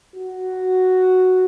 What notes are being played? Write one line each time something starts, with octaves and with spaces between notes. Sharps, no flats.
F#4